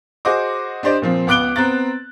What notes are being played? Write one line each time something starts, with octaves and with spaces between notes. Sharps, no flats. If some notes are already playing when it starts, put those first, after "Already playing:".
F#4 G#4 C5 D#5 D6
D4 G4 C5 D5 D#5
A#2 F3 C4
C#2 B3 D6 F#6 D7 G7
B3 C4 A#5 F#6 A6